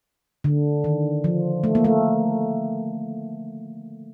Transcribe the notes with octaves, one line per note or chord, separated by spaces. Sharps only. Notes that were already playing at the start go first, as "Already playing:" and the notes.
D3
D#3
F3
A3
A#3
A3